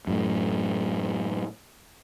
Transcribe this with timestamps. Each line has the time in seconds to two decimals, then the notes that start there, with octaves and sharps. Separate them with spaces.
0.07 F#2 A2